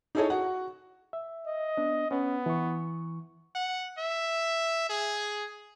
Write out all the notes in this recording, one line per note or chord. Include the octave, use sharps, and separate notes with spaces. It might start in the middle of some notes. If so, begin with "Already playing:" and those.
D#4 E4 G#4 A4 C#5 D#5
F#4 F#5
E5
D#5
B3 D4
B3 C#4
E3 C#6
F#5
E5
G#4